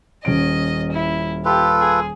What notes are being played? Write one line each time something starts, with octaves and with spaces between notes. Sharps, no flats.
D#1 C#4 D#5 D7
E4
F4 G4 A4 B4
G#4